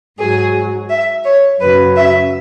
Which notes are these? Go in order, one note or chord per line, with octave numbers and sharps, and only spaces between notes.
G#2 F#3 G#4
E5
C#5
F#2 C#3 F#3 B4
E5